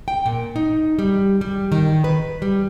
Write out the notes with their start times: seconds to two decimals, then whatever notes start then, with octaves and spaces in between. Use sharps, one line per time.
0.08 G5
0.26 A#2
0.56 D#4
0.99 G3
1.41 G3
1.72 D#3
2.04 B4
2.42 G3